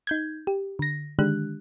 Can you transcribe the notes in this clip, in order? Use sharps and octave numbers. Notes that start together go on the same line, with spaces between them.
D#4 G6 G#6
G4
D3 A#6
D3 D#3 G#3 D4 G4 F#6